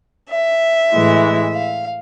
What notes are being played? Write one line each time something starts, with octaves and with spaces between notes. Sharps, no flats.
E5
A2 E3 G#3
F5